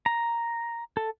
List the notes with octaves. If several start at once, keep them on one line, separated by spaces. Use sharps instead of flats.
A#5
A4